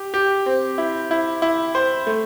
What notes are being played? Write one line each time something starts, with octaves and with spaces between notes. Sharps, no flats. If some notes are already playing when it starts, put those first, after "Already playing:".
Already playing: G4
G4
C4
E4
E4
E4
C5
A3